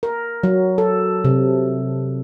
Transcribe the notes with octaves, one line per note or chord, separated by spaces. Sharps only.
A#4
F#3
A4
C3